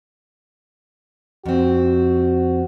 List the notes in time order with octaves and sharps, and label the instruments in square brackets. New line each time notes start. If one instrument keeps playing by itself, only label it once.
[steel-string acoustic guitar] F2 C4 [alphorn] F#4